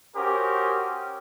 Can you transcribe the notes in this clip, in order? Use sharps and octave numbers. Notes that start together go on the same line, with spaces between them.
C#4 F#4 G4 A#4 C5 D#6